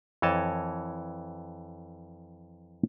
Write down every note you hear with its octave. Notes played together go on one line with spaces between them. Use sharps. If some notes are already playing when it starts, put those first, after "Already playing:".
F2 E3 C#5 D#5 A5